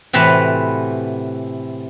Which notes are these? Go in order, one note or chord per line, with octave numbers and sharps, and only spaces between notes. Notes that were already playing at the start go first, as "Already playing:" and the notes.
A2 C3 E3 F#4 B4 A5